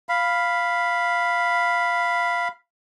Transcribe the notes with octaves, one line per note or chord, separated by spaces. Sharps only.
F5 B5